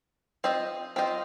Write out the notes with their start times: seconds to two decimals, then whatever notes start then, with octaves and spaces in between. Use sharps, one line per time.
0.44 C4 F4 C5 D#5
0.96 C4 F4 C5 D#5